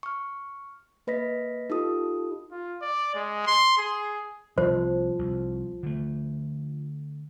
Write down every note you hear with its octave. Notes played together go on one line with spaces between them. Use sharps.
C#6 F6
A#3 B4 D#5 A#6 B6
D#4 F4 G4 A4 D#6
F4
D5
G#3
C6
G#4
C2 F3 C5
C2
D3 A3